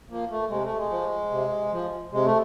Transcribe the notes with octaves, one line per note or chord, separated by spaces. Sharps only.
F3 A#3
A3
C3 G#3
A3
G#3
F3
C3
F3
C3 G#3
A3